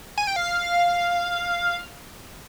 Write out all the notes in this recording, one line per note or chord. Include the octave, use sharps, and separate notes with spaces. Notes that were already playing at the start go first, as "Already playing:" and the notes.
G#5
G5
F5